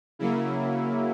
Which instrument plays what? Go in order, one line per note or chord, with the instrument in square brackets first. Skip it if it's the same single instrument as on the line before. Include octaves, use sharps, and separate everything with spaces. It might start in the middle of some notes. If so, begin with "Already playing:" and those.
[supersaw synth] C#3 F#3 A#3 E4